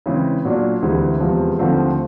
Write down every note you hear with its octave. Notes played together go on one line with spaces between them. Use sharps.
C#3 E3 G#3 C4
A#2 F#3 A#3 D4
D2 C3 E3 G#3
E2 C3 F3 G#3
D#2 D3 F3 A3 C4